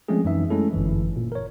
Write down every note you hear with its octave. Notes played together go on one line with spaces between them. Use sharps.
F3 G#3 A3 C4 C#4 G#4
F#2 E3 D#4 E5
G#3 A3 C#4 E4 A4
G1 F#2 E3
A#2
A#4 C#5